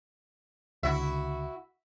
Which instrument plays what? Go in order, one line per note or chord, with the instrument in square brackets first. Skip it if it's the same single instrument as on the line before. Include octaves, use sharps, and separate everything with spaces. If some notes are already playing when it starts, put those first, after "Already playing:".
[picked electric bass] C#2 D3 [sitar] E4 F#4 E5